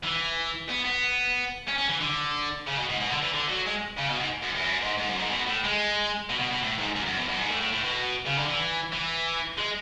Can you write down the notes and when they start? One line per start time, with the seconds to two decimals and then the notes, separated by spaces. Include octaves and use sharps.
0.03 E3
0.69 B3
0.85 B3
1.68 C#4
1.78 C#4
1.89 E3
2.01 D3
2.67 C#3
2.77 B2
2.89 G#2
3.00 B2
3.10 D3
3.22 E3
3.33 D3
3.48 F#3
3.66 G#3
3.98 C#3
4.09 B2
4.20 G#2
4.42 F#2
4.54 E2
4.64 F#2
4.81 G#2
4.98 G#2
5.08 F#2
5.19 G#2
5.30 B2
5.47 A2
5.64 G#3
6.29 B2
6.40 B2
6.51 B2
6.62 A2
6.78 G#2
6.96 F#2
7.06 F#2
7.17 E2
7.29 F#2
7.39 G#2
7.50 A2
7.60 A2
7.72 A2
7.83 B2
8.27 C#3
8.37 D3
8.48 E3
8.93 E3
9.58 G#3